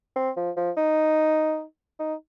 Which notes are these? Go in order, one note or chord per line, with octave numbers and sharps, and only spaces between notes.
C4
F3
F3
D#4
D#4